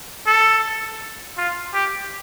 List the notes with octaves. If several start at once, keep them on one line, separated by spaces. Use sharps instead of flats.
A4
F4
G4